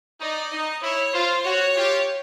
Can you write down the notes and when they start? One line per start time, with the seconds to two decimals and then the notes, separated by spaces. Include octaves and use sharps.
0.21 D#4 D5
0.51 D#4 D#5
0.82 E4 C#5
1.13 F4 C5
1.44 F#4 C#5
1.75 F4 G4